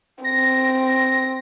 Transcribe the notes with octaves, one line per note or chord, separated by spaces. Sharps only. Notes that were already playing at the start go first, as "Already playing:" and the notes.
C4 A#6